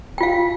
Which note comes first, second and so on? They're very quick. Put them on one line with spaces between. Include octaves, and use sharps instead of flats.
G5 F4 F5